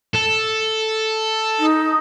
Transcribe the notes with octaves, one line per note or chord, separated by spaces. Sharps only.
A4
D#4